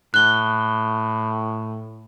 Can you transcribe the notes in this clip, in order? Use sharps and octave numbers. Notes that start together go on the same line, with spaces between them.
A2 F#6 G7